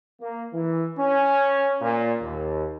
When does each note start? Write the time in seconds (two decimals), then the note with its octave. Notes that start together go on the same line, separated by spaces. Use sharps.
0.21 A#3
0.53 E3
0.98 C#4
1.81 A#2
2.22 D#2